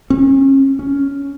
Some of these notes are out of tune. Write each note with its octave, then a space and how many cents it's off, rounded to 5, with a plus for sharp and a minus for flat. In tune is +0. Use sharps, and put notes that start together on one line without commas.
C#4 -35
C#4 +5